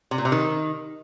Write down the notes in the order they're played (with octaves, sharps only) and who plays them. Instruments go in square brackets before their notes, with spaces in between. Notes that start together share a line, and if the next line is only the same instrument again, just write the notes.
[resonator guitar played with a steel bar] C3
A#2
C3
D#3